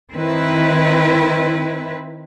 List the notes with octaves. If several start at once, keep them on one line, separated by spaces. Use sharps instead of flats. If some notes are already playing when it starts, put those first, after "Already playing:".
D#3 C4 E4 B4